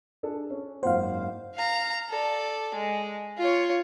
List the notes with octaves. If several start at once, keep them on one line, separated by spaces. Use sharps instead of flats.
D4 G#4 A4
C#4
F#1 G#2 C5 F5 F#5
F5 A#5
A4 D5
G#3
F4 C#5